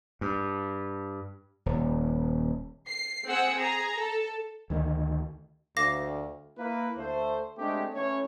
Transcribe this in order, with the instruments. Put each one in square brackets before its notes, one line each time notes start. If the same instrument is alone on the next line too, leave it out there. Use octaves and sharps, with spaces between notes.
[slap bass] G2
D#1
[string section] C7
C4 G#4 F#5 E6
G#4 A#5
A4
[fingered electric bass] D2 D#3 A3
[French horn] D2 [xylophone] F5 D6 A#6
[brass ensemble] A#3 E4 B4
D2 A3 C5
G#3 A3 C4 D4 G4
E3 A3 C#4 C#5